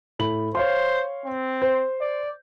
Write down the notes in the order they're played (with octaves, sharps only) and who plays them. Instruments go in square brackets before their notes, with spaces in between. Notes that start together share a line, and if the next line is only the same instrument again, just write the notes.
[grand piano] A2 B5 F#7
[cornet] C5 [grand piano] C#5 F5 C6
[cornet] C4
[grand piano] C5
[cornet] D5